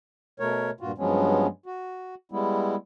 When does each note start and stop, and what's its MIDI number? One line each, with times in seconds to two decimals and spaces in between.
0.40 0.70 47
0.40 0.70 57
0.40 0.70 70
0.40 0.70 73
0.80 0.92 43
0.80 0.92 46
0.80 0.92 65
0.80 0.92 66
0.98 1.47 43
0.98 1.47 53
0.98 1.47 54
0.98 1.47 56
0.98 1.47 59
0.98 1.47 61
1.66 2.15 66
2.32 2.75 55
2.32 2.75 56
2.32 2.75 59
2.32 2.75 64